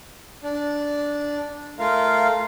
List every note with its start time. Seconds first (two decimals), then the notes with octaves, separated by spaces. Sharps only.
0.43 D4
1.79 A3 F4 A#4 F5